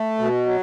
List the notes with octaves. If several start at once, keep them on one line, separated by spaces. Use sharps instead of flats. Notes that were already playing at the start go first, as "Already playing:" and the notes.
Already playing: A3
B2
F#3